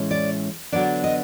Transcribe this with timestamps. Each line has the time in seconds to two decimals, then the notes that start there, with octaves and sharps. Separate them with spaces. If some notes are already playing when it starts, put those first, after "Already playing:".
Already playing: A2 E3 G#3 C#4
0.11 D5
0.72 D3 F#3 B3 D4 D5
1.04 D#5